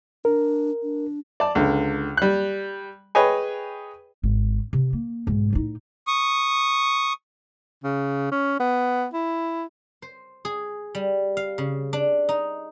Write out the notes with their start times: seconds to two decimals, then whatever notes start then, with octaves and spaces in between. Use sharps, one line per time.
0.25 D4 A#4
0.83 D4
1.40 D5 A5
1.55 C#2 D3
2.17 G3 F#6
3.15 G#4 B4 C#5 D#5 G5 G#5
4.23 G#1
4.73 C3
4.93 A#3
5.27 B1 G#2
5.53 A2 D#4
6.07 C#6 D#6
7.84 C#3
8.32 C#4
8.60 B3
9.13 E4
10.02 C5
10.45 G#4
10.95 G3
11.37 F5
11.58 C#3
11.93 D4
12.29 D#4